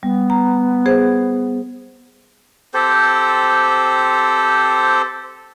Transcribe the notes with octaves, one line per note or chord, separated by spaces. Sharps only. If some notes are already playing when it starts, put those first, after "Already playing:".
G3 B3
A#5
G#4 C5
C4 G4 A4 C5